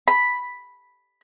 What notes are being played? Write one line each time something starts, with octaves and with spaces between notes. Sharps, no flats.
B5